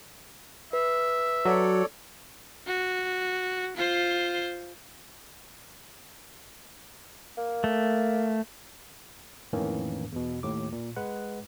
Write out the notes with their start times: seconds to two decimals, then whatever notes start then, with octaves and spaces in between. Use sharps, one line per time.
0.73 B4 E5
1.45 F#3 A4 C#5 D5
2.67 F#4
3.77 F4 C5
7.38 A#3
7.64 A3
9.53 F2 A2 D#3 E3 A#3 C#4
10.12 E2 B2
10.43 D#2 A2 D6
10.72 A#2
10.96 G#3 B4 F#5